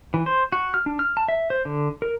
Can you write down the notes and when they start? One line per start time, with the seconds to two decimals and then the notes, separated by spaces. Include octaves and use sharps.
0.14 E3
0.26 C5
0.52 F#4
0.74 F6
0.86 D4
0.99 F6
1.17 A5
1.28 E5
1.50 C5
1.65 D3
2.02 A#4